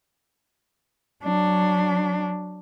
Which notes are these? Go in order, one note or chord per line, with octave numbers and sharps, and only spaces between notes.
F#3 D4